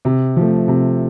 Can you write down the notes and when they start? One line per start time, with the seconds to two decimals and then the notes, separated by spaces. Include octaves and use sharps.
0.05 C3
0.37 F3 A3
0.68 C3